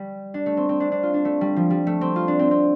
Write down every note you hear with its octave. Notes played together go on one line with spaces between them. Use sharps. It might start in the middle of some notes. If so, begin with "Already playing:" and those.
Already playing: G3
D4
A3
C4
C4
D4
D4
F4
D4
A3
G3
F3
G3
A3
C4
F4
D4
C4
C4